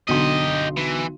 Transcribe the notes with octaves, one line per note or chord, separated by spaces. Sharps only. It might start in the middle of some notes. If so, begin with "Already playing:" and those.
B1 D3 G4 D#5 C6
E3